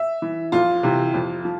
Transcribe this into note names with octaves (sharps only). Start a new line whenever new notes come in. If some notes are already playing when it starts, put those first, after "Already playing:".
Already playing: E5
E3
F2 F4
C3 E3
F2
F3